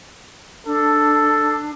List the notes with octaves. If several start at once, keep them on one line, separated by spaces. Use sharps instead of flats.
D4 A4